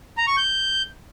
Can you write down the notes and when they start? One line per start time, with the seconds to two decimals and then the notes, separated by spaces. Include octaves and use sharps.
0.17 A#5
0.27 C#6
0.37 G6